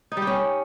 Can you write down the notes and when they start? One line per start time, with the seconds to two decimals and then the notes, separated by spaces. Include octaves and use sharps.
0.12 D#4
0.17 G3
0.22 G4
0.27 C#4